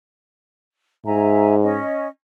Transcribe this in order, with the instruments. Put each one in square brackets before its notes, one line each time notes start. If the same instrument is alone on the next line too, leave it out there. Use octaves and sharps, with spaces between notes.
[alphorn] G#2 [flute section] E5 G#5 A#5
[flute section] C#4 D#5